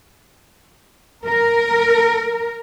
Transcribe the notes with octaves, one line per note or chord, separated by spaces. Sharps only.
A#4